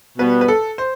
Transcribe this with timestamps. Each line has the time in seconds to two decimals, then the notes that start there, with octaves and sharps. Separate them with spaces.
0.18 B2 G3 B3 B4
0.41 B4
0.48 A4
0.78 C5